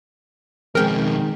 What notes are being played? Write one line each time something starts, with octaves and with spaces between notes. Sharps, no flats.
F2 B2 D#3 G#3 C4 G#4 A#4 G5